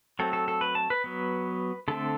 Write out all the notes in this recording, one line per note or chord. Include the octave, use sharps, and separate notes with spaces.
F#3 A3 C4 A4
A4
A4
B4
A5
B4
F#3 B3
D3 A3 C4 A4